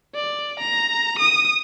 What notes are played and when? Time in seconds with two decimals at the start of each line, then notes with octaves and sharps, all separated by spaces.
0.15 D5
0.60 A#5
1.19 D#6